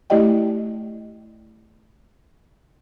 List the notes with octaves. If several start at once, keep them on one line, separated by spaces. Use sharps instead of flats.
A3 E4 G4 D5 D#5 G5